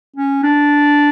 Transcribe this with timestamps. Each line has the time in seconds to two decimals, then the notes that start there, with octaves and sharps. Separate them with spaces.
0.16 C#4
0.43 D4